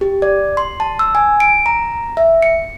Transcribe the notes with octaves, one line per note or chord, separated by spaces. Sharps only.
G4
D5
C6
A5
E6
G#5
D7
A#5
E5
C#7